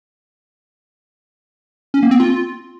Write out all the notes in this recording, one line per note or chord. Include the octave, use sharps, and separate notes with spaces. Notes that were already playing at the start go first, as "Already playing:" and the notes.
C#4
A#3
C4
F4